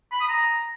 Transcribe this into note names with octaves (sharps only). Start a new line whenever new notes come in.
B5
D#6
A#5